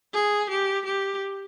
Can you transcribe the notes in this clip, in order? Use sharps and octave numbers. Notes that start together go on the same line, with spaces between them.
G#4
G4
G4